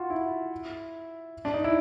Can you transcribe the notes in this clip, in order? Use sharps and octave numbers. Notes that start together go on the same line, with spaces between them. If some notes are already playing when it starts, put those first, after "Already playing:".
Already playing: F4 F#4
E4
D4
D#4
E4